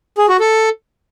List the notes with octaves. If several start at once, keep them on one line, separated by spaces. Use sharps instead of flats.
G#4
F#4
A4